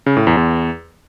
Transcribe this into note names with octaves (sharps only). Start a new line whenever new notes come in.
C#3
A2
E2
E2